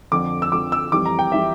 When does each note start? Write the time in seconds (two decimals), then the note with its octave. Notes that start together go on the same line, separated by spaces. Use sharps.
0.12 F2 D3 F3 D6
0.42 E6
0.51 F2 D3 F3 D6
0.72 E6
0.92 F2 E3 G3 D6
1.06 A#5
1.19 G5
1.32 E3 G3 E5